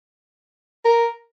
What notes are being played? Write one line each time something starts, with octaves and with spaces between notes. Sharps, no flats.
A#4